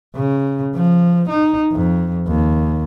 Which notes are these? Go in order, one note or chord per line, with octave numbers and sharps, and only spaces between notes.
C#3
F3
D#4
F2
D#2